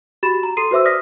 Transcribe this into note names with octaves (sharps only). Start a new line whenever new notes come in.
F#4 G4 B5 A6 E7
A#5
A4 C6 C7 D#7
F#4 B4 C5 E5 D6 E6
D5 D#6 F6 A#6 B6